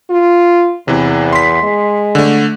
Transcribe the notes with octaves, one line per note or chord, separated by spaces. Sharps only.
F4
E2 C3 E3
C6 B6
G#3
D3 A3